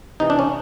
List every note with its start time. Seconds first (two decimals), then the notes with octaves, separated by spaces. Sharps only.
0.20 C3 E3 D#4
0.30 D4
0.39 C#4